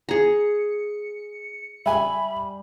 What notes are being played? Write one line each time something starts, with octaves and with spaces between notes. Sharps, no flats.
G#4 A#5 C#7
G3 E5 G#5 B5